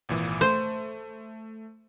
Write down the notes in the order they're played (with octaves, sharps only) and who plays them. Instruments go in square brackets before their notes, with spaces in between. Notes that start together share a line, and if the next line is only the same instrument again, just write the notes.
[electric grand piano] G#1 A#2 E3
[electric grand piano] A3 [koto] C5